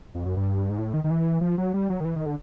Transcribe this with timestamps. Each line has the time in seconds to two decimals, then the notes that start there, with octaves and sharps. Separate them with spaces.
0.15 F2
0.25 F#2
0.37 G2
0.70 G#2
0.78 A2
0.94 D#3
1.04 D#3
1.10 E3
1.41 F3
1.58 F#3
1.74 G3
1.90 F#3
2.00 D#3
2.05 E3
2.16 D#3
2.26 D3